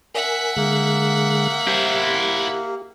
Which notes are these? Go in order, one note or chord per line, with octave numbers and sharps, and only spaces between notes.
A#4 E5 F#5 G#5
D3 G#3 A#3 G#4
E4 G4 C5